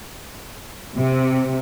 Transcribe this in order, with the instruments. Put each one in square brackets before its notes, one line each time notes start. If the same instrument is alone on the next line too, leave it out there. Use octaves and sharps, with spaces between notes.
[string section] C3